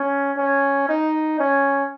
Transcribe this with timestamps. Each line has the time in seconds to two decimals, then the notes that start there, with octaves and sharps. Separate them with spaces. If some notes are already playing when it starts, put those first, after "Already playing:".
Already playing: C#4
0.38 C#4
0.89 D#4
1.40 C#4